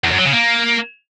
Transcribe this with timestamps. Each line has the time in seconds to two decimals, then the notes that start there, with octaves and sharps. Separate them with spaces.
0.04 E2
0.11 F#2
0.19 F#3
0.26 C#3
0.33 A#3